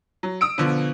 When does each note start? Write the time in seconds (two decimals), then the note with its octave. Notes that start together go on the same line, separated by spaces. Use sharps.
0.23 F#3
0.41 D#6 E6 D7
0.58 B2 D3 F3 B3